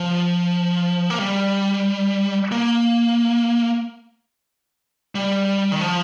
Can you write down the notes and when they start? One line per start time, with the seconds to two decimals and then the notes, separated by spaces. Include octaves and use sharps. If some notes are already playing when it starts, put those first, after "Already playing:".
Already playing: F3
1.10 A#3
1.20 G3
2.52 A#3
5.15 G3
5.72 D#3
5.81 F3